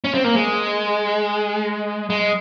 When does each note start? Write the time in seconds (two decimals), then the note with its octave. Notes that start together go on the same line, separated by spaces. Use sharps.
0.04 C#4
0.14 C4
0.24 A#3
0.35 G#3
2.10 G#3